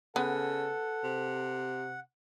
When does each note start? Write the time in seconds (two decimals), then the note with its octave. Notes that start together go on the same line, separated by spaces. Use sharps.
0.16 C#3 B3 A4 F#5
1.04 C3